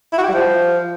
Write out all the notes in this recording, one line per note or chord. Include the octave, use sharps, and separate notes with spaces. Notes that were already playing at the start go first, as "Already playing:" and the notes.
E4
F#4
G4
G3
F3